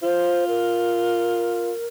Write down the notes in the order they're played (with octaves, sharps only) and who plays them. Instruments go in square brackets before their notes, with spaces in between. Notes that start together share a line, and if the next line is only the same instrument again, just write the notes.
[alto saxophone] F4 [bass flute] C5
[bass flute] A#4